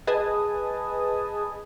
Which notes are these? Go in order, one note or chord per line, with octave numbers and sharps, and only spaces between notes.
G#4 B4 D#5 G#5 A5 D#6